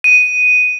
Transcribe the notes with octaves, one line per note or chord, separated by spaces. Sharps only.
D#7